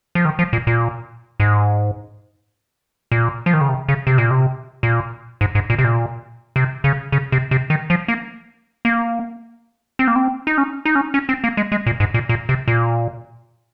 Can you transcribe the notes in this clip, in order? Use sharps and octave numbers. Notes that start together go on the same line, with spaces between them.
F3
D#3
F3
A#2
A#2
G#2
A#2
F3
D#3
C#3
C3
C#3
C3
A#2
C3
A#2
G#2
G#2
A#2
C3
A#2
C3
C#3
C#3
C3
C3
D#3
F3
A#3
A#3
C4
A#3
C4
D#4
C#4
D#4
C#4
C#4
C4
A#3
G#3
G#3
A#2
G#2
A#2
A#2
C3
A#2